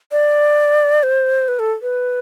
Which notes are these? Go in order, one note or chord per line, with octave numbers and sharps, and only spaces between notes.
D5
C5
B4
A4
B4